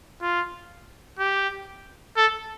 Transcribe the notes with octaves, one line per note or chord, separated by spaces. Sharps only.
F4
G4
A4